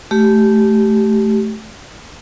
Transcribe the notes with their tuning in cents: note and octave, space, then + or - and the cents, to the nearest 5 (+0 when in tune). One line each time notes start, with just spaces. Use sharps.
A3 -15 G4 -15